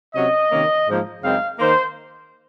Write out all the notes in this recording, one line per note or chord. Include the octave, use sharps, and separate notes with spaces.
C3 F#3 C#4 D#5
C3 D#3 A#3 C#4
G#2 F3 A#3
F#2 C#3 G#3 C4 D#4 F5
D#3 A#3 D#4 C5